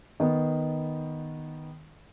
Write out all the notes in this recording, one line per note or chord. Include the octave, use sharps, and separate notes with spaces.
D#3 B3